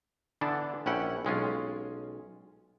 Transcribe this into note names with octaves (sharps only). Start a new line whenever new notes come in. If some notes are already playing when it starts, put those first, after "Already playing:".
D3 E3 B3 D4 A5
A#1 C#4 E4 F#5 G5
B1 G#3 C#4 F4